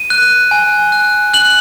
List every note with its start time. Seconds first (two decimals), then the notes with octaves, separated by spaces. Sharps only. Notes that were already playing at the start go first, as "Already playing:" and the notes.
Already playing: D#7
0.10 F#6
0.51 G#5
0.92 F#6
1.34 F#6 F#7